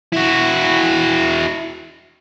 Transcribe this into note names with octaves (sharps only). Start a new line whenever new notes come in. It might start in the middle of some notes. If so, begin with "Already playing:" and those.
E4 F#4